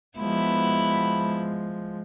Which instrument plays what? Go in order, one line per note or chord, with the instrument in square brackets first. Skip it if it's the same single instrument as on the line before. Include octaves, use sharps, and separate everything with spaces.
[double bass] F3 G#3 [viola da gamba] B3 E4 [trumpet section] F#4 B5